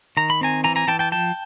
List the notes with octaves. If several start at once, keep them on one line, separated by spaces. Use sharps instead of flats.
D#3 A#5
B5
C4 G#5 A#5
E3 G#5 A#5
G#5 A#5
E3 G5 A5
G5 A5
F3 G5 A5